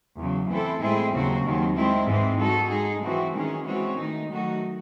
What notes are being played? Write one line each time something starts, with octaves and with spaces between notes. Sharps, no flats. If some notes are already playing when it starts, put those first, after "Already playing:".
E2 C#3 F#3
E3 A3 C4 E4 A4
A2 G#3 C4 E4 G#4
D#2 C#3 F#3 C4 F#4
D#2 D#3 F#3 C4
D#3 G#3 C4 E4
G#2 E3 G#3 C4
G#3 D#4 F#4 A4
G#3 D#4 G#4
E3 C4 F#4
D#3 G#3 C#4 G#4
E3 G#3 C4 F#4 C#5
D#3 A3 D#4
D#3 F#3 A3 D#4 F#4